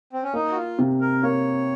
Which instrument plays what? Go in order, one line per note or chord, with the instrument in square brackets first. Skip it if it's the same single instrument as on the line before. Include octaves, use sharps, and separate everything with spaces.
[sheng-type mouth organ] C4
C#4
[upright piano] A#3 [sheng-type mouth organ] D#4
[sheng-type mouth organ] F#4
F4
[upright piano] C3
[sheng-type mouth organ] A#4
[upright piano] A#3 [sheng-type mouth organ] C#5